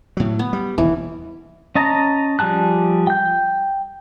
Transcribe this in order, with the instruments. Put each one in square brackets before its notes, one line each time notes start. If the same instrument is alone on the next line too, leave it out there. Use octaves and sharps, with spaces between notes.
[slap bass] A2 F#3
[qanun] B3
[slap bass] G3
[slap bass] E1 D#2 [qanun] E3
[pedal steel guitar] C#4 D#5 A5 A#5
F3 G3 G#4 A5 F#6
G5 G6